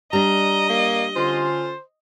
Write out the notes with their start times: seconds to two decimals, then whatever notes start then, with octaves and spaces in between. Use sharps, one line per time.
0.13 G3 D4 D#5 A#5
0.69 A#3
1.16 D3 C#4 F4 C5